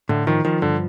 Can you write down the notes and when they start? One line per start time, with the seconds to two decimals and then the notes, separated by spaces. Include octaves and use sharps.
0.09 A2 D3
0.27 D#3 F3
0.45 D#3 F3
0.62 G2 D3